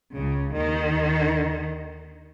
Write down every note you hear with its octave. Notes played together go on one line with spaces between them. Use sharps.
C#2 C#3
D#2 D#3